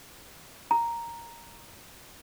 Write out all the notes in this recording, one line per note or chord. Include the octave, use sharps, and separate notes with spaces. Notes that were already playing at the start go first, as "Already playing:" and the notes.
A#5